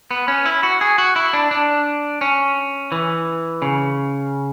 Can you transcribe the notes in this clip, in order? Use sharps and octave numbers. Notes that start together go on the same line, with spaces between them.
B3
C#4
E4
F#4
G#4
F#4
E4
D4
D4
C#4
E3
C#3